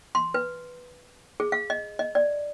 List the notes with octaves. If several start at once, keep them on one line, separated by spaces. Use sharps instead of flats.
C6
B4
G#4
F5
D#5
D#5
D5